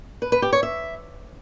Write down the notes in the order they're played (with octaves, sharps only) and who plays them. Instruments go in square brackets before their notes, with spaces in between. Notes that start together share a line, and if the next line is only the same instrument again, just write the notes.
[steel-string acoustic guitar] B4
B4
G4
C#5
E5